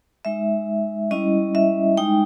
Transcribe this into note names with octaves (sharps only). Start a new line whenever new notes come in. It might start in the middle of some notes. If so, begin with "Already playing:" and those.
G#3 D#4 E5
G3 C#4 E4 D#5
E5
G#3 D#4 G5